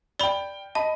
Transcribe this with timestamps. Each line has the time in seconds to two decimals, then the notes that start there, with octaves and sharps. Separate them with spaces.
0.20 D5 G5 B5 G7
0.75 D#5 A5 B5